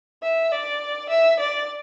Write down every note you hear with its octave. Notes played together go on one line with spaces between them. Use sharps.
E5
D5
E5
D5